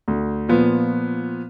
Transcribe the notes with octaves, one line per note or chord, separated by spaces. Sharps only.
D2
A#2 F3 B3